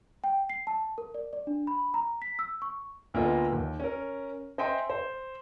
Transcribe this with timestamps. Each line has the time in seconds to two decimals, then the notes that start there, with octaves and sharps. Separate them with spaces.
0.24 G5
0.50 C7
0.67 A5
0.98 A#4
1.14 D5
1.33 D5
1.47 D4
1.67 B5
1.94 A#5
2.22 B6
2.39 E6
2.62 C#6
3.14 D2 A#3 B3 F4 A4 D#5
3.53 D#2
3.80 C#4 A#4
4.58 C5 D#5 E5 G5 G#5 C6
4.90 C5